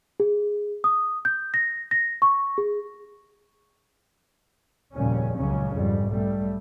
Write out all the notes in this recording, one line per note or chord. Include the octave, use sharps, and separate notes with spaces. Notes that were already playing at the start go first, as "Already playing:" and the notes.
G#4
D#6
G6
A#6
A#6
C#6
G#4
F1 D#2 A#2 C#3 G3 C#4
C#2 A#2 C#3 F#3 C#4
F2 G#2 G3
B1 G3 A3